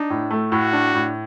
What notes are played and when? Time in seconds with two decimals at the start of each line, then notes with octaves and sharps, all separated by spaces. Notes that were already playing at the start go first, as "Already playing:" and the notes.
Already playing: D4 D#4
0.10 A2
0.31 A3
0.52 A2 F#4
0.73 D4
0.95 A2